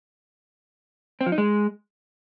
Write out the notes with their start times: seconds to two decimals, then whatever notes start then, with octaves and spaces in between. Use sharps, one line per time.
1.21 C4
1.26 F3
1.32 D#4
1.38 G#3